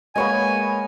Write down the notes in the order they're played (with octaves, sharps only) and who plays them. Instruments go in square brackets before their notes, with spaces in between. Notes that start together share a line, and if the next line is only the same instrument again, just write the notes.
[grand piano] G#3 A#3 B4 [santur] B3 C#5 D#5 [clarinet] G#5